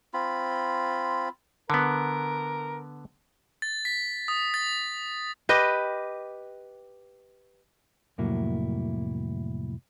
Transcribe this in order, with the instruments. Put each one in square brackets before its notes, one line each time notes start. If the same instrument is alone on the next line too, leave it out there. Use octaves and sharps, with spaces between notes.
[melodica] C4 F4 B5
[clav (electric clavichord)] D3 B3 [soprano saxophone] A#4
[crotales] A6
B6
D#6
A6
[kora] G4 B4 D#5
[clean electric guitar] C2 F2 A2 F#3 A#3 E4